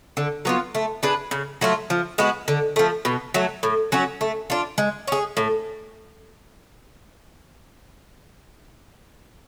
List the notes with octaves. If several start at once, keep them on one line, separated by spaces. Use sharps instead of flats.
D3
F#3 B3 F4
A3
D4 G#4 B4
C#3
F#3 A3 F4
F3
G#3 B3 F#4
D3
F3 A3
B2
F#3 A3
A2
F#3 C#4 F#4
A3
D4 F4
G#3
C#4 G#4
A2